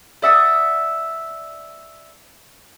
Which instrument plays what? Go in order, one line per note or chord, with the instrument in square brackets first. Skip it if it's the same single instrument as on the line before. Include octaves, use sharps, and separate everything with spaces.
[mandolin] D5 E5 F#5 D#6